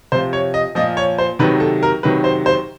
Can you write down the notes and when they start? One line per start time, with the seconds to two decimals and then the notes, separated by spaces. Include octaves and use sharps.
0.12 C3 F3 C5
0.33 C#5
0.54 D#5
0.75 A#2 F3 D#5
0.97 C#5
1.18 C5
1.39 C3 D#3 F#3 B4
1.60 A4
1.83 A#4
2.03 C3 D#3 F#3 B4
2.24 C5
2.46 C5